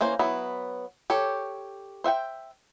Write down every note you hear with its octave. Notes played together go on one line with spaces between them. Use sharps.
E3 A#3 C#4 C5
F#3 B3 E4
G4 A4 C#5
C5 E5 F#5 G5